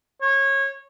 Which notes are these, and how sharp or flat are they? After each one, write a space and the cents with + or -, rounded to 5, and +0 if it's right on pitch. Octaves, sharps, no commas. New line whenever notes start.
C#5 -20